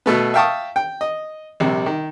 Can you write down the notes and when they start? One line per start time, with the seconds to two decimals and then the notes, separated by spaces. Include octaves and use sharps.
0.06 B2 A3 B3
0.34 E5 F5 G5 A5 C#6 D#6
0.76 G5
1.01 D#5
1.60 A#1 C3 G3
1.86 D#3